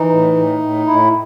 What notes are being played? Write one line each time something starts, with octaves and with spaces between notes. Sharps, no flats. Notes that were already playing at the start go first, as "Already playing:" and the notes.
Already playing: E3 D#4
A2
A2
A2
A2 E4